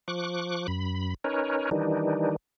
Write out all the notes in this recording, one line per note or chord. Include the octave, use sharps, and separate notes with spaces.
F3 C#6 D6 F#6
F#2 B5
C#4 D#4 A#4 B4 C#5
D#3 E3 G3 D4 D#4